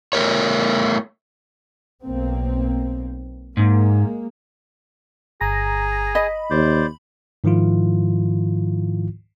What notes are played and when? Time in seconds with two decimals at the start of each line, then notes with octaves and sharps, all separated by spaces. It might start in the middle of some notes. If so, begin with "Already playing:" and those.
0.13 A3 A#4 C#5
2.03 B1 A#3 C4
3.57 G#2 G#3 A#3
5.41 G1 G#4 A#5 A#6
6.15 D#5 B5
6.51 D#2 C5 D5
7.44 G#2 D#3 F3 E4 F4